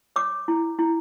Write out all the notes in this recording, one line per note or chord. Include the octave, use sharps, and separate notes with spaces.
C#5 D6
E4
E4